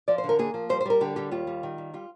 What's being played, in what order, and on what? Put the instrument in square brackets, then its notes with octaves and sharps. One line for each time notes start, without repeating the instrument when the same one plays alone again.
[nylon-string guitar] F3 D5
C5
D3
A#4
A#3 G#4
F3
G3 C5
C5
G3 A#4
D3 G4
G3 G4
D#2 F4
G3
D#3
G3
G3 F4